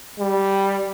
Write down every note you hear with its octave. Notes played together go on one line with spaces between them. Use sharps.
G3